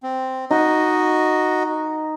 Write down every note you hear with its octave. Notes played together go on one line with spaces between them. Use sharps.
C4
D#4 F#4 D#5